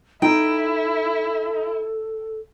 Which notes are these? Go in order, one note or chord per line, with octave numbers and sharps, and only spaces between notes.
D#4 E4 A4 G5